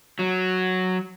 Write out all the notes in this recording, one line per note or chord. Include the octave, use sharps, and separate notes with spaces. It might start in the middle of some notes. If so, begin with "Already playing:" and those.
F#3